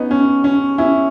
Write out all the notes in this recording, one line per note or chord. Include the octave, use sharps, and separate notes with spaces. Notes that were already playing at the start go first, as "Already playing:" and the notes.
Already playing: B3 C#4 D#4
C#4
C#4
C#4 E4